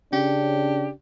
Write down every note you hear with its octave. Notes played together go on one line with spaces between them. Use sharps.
C#3 C#4 D4 G4